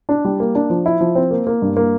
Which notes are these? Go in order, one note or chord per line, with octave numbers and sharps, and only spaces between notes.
D4
G3
A#3
D4
F3
E4
F3
C4
A#3
A#3
G2
A#3